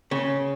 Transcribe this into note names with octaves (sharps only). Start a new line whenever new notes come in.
C#3